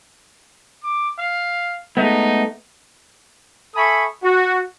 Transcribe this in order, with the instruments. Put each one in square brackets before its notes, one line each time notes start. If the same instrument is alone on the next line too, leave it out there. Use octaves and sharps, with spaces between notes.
[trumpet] D6
F5
[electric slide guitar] G#3 A3 B3 [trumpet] D#4
[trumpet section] A4 E5 G#5 B5 C#6 D#6
F#4